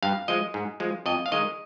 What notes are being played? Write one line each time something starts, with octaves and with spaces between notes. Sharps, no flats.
G2 F5
F3 G#3 D#5
G#2
F3 G#3
F2 D#5
F5
D#3 G#3 D#5